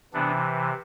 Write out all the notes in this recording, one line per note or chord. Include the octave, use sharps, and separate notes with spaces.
C3 E3 B3 D4